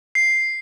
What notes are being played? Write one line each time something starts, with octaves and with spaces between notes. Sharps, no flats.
C7